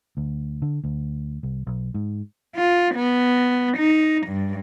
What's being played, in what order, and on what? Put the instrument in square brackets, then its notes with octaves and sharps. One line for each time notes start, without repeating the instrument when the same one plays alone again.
[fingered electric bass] D2
D3
D2
C2
B1
G#2
[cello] F4
B3
D#4
G2